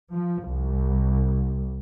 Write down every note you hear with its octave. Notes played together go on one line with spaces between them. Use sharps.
F3
C2